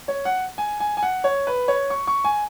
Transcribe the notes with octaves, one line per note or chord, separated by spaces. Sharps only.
C#5
F#5
G#5
G#5
G#5
F#5
C#5
B4
C#5
C#6
C#6
G#5